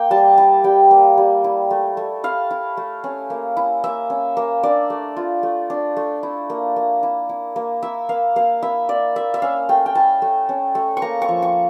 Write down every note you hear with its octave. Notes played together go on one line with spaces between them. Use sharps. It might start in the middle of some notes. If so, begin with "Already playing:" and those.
Already playing: A#3 G5
G3 A5
E4 A5
G3 G5
A#3
G3
E4
A3
A3
E4 F5
E4
A3
C#4
A#3
E4
A#3 E5
C#4
A#3
D4 D5
A3
F4
A3
D4
A3
E4
A#3
A#3
E4
E4
A#3
E4 E5
A#3 F5
A#3 F5
E4 E5
E4 D5
A#3 E5
E5
C#4 F5
A3 G5
G5
E4 A5
A3
C#4
A3
C#6
A#3 A#5
C#6
F3
C#6